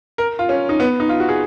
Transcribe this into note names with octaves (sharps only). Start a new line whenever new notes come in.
A#4
F4
C#4
D#4
B3
D#4
F4
F#4
G#4